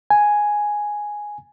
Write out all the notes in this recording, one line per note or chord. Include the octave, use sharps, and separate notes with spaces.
G#5